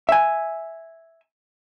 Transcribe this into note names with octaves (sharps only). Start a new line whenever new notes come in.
E5 G#5